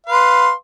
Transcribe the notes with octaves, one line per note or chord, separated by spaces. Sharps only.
B4 F5 C6